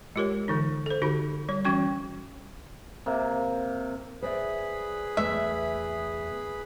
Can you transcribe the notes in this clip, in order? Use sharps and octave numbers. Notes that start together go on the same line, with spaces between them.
G#3 F4 G4 A#4 C#5
D3 E3 D#4
A4 C5
D3 D#4 F#4 G4 B5
G3 C#5
E3 G3 C#4 F#4 C#6
C3 A#3
G#4 B4 C5 D5 E5 B5
E2 A3 E5